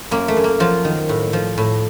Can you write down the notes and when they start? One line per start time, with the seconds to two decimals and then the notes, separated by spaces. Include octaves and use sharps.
0.11 F#2 A#3
0.28 A3
0.37 F#2
0.44 A#3
0.60 F3 F#3 F4
0.85 D#3
1.09 A2
1.33 F3
1.58 A2